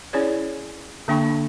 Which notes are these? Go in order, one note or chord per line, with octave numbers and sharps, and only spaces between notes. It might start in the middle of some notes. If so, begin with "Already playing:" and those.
C#4 E4 G#4 C#5 D5
D3 A#3 D4 G5 B5 C#6